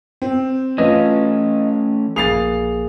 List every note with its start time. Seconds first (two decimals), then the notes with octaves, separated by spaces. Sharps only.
0.22 C4
0.78 E3 A3 C#4 F4 B4 D#5
2.16 A#1 A#3 G#4 A6 C7 F7